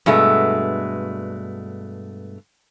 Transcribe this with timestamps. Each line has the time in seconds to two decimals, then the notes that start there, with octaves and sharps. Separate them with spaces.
0.06 G2 B2 G#3 A3